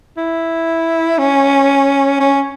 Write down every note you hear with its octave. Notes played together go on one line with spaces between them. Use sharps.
E4
C#4
C#4